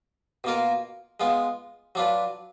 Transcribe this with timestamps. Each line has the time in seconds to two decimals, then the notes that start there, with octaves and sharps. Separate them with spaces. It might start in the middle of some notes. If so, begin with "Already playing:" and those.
0.44 B2 A#3 F4 A#4
1.20 G#3 B3 F4
1.95 F#3 D4 F4 B4